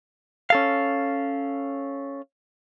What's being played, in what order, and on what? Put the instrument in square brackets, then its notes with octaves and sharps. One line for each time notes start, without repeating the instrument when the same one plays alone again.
[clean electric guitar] C#4 A4 F5